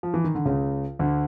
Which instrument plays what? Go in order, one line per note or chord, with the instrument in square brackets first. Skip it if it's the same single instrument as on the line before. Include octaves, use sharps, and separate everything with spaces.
[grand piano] F3
E3
D#3
D3
C#2 C#3
D2 D3